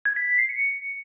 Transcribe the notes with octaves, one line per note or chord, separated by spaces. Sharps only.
G#6
B6
B6
C7
C#7